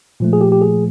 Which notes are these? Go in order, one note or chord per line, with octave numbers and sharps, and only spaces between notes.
A#2 F3 A3
G#4
G4
G4
G#4